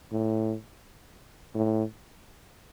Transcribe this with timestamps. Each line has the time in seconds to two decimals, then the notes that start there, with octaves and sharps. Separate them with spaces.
0.12 A2
1.55 A2